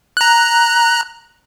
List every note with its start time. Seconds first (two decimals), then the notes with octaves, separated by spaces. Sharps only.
0.17 A#5 F#6